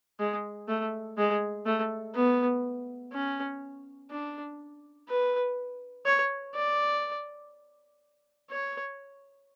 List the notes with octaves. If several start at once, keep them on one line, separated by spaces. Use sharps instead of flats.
G#3
A3
G#3
A3
B3
C#4
D4
B4
C#5
D5
C#5